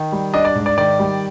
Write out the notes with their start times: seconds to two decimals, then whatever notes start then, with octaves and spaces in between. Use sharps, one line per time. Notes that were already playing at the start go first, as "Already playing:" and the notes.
Already playing: D#3
0.12 G3
0.34 D4 D#5
0.45 D5
0.55 G#2
0.66 D5
0.78 D#3 D5
0.99 G3